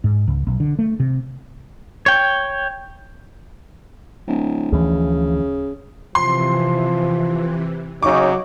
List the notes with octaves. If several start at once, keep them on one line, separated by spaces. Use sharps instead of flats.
G#2
C#2
B1
D3
A3
C3
C#5 G5
D1
D2 C#3 E3 F3
C3 E3 F3 C6
C#3 F#3 D#4 C#6 D6